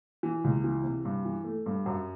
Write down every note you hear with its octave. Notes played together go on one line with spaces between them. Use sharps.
E3
C#2
E3
C3
G2
E3
A3
G2
F#2